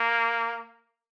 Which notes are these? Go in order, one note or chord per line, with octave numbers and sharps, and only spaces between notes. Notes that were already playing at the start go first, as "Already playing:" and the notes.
Already playing: A#3